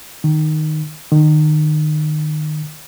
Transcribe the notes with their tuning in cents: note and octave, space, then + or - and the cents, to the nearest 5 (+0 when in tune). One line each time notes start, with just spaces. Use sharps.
D#3 -10
D#3 -30